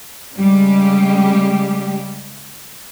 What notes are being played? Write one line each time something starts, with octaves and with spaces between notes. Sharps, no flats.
C#3 G3 G#3 G4